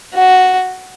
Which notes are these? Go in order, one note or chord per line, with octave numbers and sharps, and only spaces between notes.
F#4